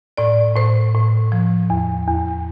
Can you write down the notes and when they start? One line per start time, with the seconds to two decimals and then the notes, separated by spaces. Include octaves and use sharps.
0.17 A2 D5
0.56 A2 C5
0.95 A2
1.32 F3
1.70 E2
2.08 E2